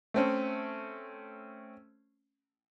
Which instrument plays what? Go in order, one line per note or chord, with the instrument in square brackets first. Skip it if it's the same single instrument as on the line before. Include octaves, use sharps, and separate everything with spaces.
[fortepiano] A3 C4 C#4